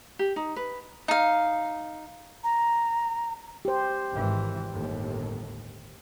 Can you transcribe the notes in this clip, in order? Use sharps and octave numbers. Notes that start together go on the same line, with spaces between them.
G4
D#4
B4
D#4 F5
A#5
G4 C5
G#1 E3
G1 D#2 A2